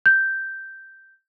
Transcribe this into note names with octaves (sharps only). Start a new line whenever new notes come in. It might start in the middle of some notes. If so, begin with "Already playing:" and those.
G6